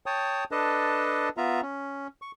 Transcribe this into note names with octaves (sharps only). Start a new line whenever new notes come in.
C#5 G5 A5 D#6
D4 A4 B4 D#5 A5
B3 F4 E5 A#5
C#4
C#6